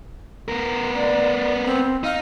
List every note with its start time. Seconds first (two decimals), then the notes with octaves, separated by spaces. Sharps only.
0.48 B3 A#4
0.94 D5
1.65 C4
2.04 D#4 F5